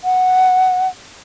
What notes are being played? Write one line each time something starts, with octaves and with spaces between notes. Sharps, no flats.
F#5